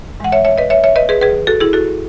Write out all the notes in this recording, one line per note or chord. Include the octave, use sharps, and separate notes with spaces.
A2 E3 G#3 F#5
C#5 E5
C#5 E5
B4 D#5
C#5 E5
C#5 E5
B4 D#5
G#4 B4
D#2 D#3 F#3 G#4 B4
F#4 A4
E4 G#4
F#4 A4